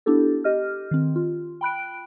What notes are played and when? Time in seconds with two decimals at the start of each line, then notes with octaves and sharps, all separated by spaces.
0.06 B3 D4 E4 G4 A4
0.44 G4 D#5 F6
0.91 D#3 C4
1.16 F4
1.61 G5 B5 F#6 D7